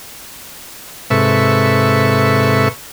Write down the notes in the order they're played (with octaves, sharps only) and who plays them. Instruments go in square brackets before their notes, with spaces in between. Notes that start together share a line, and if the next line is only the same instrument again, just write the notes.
[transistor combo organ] G#2 C3 A4 B4 E5 C#6